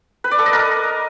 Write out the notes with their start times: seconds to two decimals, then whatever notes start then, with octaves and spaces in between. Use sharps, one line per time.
0.24 B4
0.31 D5
0.39 A4
0.46 D#5
0.53 A#4